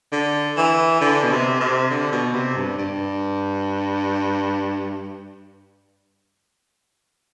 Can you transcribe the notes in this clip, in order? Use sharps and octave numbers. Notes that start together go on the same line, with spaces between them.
D3
E3
D3
B2
C3
C3
D3
B2
C3
G2
G2